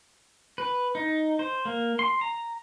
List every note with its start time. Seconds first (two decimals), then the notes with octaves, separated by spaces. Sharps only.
0.58 B4
0.95 D#4
1.39 C5
1.65 A#3
1.99 C6
2.21 A#5